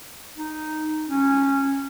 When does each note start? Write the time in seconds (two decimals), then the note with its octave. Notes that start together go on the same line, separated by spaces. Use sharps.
0.37 D#4
1.09 C#4